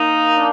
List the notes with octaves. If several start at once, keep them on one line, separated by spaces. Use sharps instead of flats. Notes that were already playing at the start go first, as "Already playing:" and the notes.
Already playing: A#3 D#4
D4